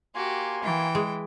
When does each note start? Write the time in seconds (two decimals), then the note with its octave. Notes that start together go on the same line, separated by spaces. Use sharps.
0.15 A#3 F#4 G4 G#5 C6
0.64 E3 G5
0.95 G#3